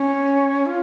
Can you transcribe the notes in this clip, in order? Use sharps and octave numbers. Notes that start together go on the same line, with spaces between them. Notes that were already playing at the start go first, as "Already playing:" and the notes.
Already playing: C#4
F4